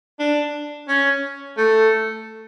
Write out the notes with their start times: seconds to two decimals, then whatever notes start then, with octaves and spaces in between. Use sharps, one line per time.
0.19 D4
0.88 C#4
1.57 A3